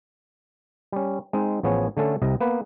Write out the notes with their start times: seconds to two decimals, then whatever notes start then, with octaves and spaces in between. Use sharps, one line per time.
0.92 G3 C#4
1.33 G#3 C4 D#4
1.63 A1 F3 B3 G#4 C#5
1.97 D3 A3 C#4 A4
2.22 C2 C3 D#5
2.41 A#3 B3 B4